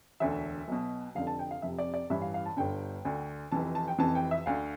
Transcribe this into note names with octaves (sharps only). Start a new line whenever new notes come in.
E1 D2 D3 E5
B1 B2
F1 F2 D3 F5
A5
G5
F5
F1 F2 C3 E5
D5
D5
A1 G2 E3 E5
F5
F5
A5
G1 G2 D3 G5
D2 D3
F1 F2 E3 A5
A5
G5
F1 F2 C3 E3 A5
G5
E5
D2 D3 F5